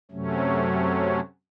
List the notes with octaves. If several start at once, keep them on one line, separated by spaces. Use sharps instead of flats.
F#2 C3 F#3 A3 C#4